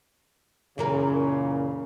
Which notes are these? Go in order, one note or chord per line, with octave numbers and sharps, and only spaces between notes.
F#2 A#2 C#3 E3 A#4